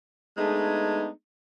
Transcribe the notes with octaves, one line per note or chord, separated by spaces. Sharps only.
G#3 A3 B3 D4 D#4 G#4